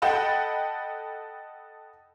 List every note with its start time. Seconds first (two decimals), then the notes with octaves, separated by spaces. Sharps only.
0.02 A4 D#5 F#5 G5 A5 B5